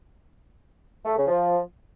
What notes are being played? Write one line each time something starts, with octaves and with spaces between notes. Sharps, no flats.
A3
C#3
F3